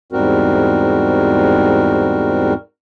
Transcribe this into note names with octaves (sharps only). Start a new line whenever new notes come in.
E2 G#2 G3 C4 F#4 A#4